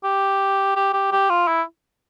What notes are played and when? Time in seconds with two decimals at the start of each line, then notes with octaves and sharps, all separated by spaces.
0.04 G4
0.76 G4
0.93 G4
1.12 G4
1.30 F4
1.47 E4